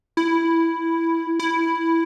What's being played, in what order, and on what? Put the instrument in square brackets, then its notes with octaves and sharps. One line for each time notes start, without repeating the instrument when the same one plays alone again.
[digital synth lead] E4
E4